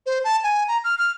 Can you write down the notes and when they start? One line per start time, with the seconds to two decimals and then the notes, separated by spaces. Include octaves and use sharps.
0.06 C5
0.24 A5
0.44 G#5
0.68 A#5
0.84 F6
0.98 F6